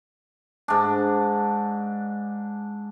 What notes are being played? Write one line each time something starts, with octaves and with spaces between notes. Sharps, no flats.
G#2 D4